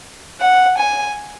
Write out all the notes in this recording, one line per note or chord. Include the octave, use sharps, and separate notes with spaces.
F#5
G#5